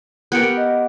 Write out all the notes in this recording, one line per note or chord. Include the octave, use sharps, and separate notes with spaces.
B3 G4 A#4 F#6 C#7 D7
D#5